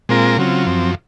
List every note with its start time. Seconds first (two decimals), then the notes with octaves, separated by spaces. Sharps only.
0.09 A#2 G#3 C4 F4 A#4
0.37 C#3 F#3 C4 F4
0.66 F#2 F3 C4